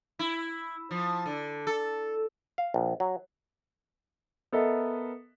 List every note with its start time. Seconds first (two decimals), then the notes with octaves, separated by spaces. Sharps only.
0.19 E4
0.91 F3
1.26 D3
1.67 A4
2.58 F5
2.74 A#1
3.00 F#3
4.52 B3 A4 A#4 D#5 E5